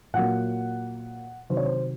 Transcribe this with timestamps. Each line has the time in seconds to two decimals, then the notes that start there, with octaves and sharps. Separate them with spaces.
0.14 A#2 F#3 A#3 F#5
1.50 C3 D#3 F#3 C5
1.57 C#5
1.65 C5